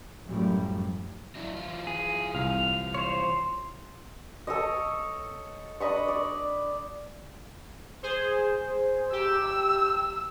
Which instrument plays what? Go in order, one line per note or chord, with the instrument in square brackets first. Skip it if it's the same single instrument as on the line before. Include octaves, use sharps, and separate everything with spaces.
[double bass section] F#2 A2 F3 G3
[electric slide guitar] F#3 D4 E4
E3 F4
[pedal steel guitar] G#4
[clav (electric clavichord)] C2 [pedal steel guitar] F5
[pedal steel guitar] C5 C#5 [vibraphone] C6
[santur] A4 C#5 D#5
D4 D#5 B5 C#6
D5
[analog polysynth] G#4 C5
[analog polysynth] G4 [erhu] E6